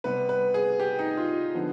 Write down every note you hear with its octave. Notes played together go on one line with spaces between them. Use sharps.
C3 G3 B3 B4
B4
G#4
G4
D#4
F4
D3 F3 B3